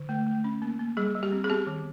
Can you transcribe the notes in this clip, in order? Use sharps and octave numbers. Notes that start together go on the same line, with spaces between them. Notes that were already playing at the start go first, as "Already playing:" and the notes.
Already playing: D3
A3
A3
C#4
A#3
A#3
G3 G#4
G3
G4
C4
G#4
B3 G4
D#3